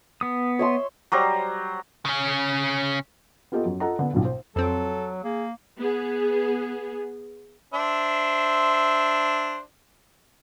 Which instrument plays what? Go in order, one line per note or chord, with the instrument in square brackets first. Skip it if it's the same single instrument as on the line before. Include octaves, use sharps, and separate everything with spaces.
[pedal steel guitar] B3 D#6
[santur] C#5 E5 C6
F#3 G3 C5 A#5
[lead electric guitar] C#3 C#4
[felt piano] B3 F4 G4 A4 D#5
F#2
F4 A4 D#5 F#5 A#5
D3 B3
B1 F#2 A#2
C5
[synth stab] F2 C4 [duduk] F#3 [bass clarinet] A4
[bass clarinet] A#3 [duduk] G#4
[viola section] B3 G#4
[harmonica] D4 C5 E5